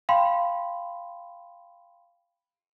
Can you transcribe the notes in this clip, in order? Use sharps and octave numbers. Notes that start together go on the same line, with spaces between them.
F5 G5 B5 C6